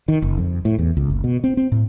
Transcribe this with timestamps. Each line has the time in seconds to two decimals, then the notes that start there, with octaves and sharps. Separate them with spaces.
0.08 D#3
0.22 F#1
0.38 F2
0.65 A2
0.78 E2
0.97 C#2
1.10 F#1
1.24 B2
1.44 C4
1.57 C4
1.72 A2